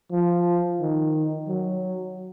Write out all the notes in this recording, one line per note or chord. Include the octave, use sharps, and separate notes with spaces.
F3
D#3
F#3